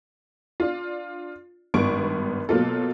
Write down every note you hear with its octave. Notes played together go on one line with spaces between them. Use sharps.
D4 F4
G#1 G2 B3 C#6 D7
B2 F#3 A#3 F4 A4